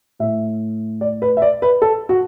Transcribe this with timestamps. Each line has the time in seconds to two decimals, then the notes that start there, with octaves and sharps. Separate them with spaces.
0.19 A2 A3 E5
1.01 D5
1.22 B4
1.37 E5
1.42 D5
1.62 B4
1.82 A4
2.09 F#4